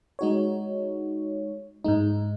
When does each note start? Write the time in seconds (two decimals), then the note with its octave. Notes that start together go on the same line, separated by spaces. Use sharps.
0.19 G#3 D#4 F#4 C#5
1.84 G#2 G#3 D#4